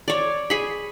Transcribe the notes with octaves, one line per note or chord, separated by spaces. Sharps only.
C#5 D5
G#4 B5